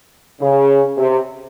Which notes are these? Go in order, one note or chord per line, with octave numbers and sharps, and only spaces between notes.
C#3
C3